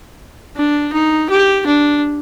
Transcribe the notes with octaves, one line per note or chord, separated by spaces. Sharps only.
D4
D#4
G4
D4